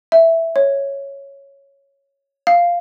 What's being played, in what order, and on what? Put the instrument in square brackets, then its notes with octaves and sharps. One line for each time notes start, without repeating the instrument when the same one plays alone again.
[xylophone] E5
C#5
F5